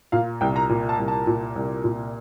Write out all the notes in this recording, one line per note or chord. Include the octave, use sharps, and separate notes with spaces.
A#2 F5
C2 G5
A#5
A#2
A5
C2
A5
A#2
C2
A#2